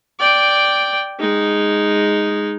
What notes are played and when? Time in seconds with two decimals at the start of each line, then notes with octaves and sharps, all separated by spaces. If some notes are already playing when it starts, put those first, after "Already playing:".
0.20 D5 G5
1.20 G#3 D#4